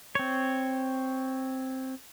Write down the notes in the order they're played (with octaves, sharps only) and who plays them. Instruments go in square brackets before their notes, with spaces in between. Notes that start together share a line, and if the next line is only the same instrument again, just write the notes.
[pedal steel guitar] C4 C#5